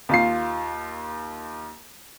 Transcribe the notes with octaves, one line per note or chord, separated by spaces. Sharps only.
D#2 F4 C7